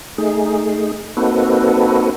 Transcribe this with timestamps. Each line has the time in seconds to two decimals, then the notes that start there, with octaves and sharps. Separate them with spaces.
0.18 A3 D#4 G#4
1.17 A#3 C4 D#4 F#4 A4 B4